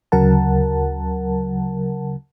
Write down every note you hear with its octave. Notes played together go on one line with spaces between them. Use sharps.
D2 C#3 F#3 A#4 F#5 A5